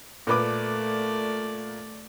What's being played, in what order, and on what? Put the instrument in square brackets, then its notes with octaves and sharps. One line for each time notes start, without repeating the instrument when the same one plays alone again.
[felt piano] A#2 B4 D6 [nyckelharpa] A3 D5